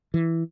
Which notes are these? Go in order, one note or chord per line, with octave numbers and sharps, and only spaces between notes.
E3